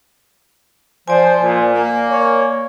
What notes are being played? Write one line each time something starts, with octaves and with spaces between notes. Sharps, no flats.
F3 C5 D5 G#5
A#2
A#3
C#5